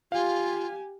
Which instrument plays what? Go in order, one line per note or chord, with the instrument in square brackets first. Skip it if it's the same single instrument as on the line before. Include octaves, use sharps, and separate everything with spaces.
[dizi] F4 [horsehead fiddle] G4 G#5 [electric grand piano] F5